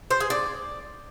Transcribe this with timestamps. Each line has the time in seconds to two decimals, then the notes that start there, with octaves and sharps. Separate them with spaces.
0.11 C5
0.20 G#4
0.30 D5